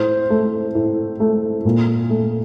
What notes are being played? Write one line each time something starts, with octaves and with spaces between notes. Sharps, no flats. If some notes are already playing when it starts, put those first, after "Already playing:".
Already playing: A2 C5
A3
A2
A3
A#2
A3